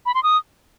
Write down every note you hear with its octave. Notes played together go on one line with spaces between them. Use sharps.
B5
C6
D#6